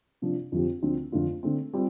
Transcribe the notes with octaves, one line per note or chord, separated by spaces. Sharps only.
C3 F3 D4
F2 D3 F3 C4 G4
D2 D3 F3 C4
F2 D3 A3 F4
D3 A3 C4
G3 C4 F4